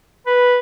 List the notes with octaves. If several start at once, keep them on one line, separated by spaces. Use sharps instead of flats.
B4